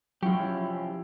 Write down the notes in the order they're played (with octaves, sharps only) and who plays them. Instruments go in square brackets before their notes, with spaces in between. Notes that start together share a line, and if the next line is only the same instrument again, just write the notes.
[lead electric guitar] F3 G4 [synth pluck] F#3 [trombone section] C#4 E4